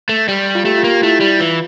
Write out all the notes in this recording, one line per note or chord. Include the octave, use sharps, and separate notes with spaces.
A3
G3 G4
F4
A3 G4
F4
A#3
G4
A3 E4
G3
E3 F4